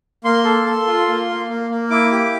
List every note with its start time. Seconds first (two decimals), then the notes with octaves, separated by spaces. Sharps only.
0.24 A#3 C6
0.45 A4
0.66 A4
0.87 F4
1.08 A#3
1.28 A#3
1.49 A#3
1.70 A#3
1.90 E4 D6
2.12 G4